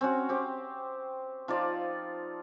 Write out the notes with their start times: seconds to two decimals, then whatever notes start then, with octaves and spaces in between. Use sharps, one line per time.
0.01 C4 C#4 F#4
0.29 C4 G4
1.48 F3 D#4 F4 D5